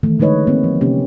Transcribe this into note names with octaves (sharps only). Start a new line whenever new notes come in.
D#3 E3 A3
D3 G#3 D#4 B4 C#5 D#5
A#3 C4
F3
C3 A#3 C#4 G4